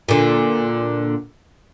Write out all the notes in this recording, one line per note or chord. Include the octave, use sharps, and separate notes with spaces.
A#2 D3